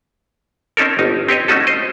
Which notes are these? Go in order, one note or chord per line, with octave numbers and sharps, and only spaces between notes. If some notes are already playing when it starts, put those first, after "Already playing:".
C4 C#4 D#4 A4 A#4
G1 D#4
C4 G4 C#5 D#5
A3 C#4 D#4 F#4 A4
C5 D#5